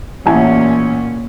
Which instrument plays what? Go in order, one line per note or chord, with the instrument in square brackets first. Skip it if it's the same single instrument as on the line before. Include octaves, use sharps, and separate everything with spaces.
[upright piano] A1 E4 G#5 [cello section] A#2 C#4